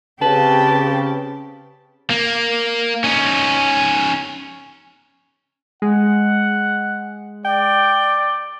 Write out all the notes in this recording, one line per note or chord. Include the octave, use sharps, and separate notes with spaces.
C#3 C4 G4 B4 A5
A#3
C#4 D#4
G#3 F#5
D5 G5